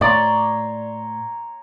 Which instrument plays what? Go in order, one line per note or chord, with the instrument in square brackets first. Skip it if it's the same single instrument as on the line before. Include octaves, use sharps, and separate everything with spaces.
[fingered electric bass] A2 [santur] C#5 A#5 C6 [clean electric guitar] D5